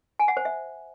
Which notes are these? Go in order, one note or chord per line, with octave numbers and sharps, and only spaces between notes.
G#5
F#5
C5
E5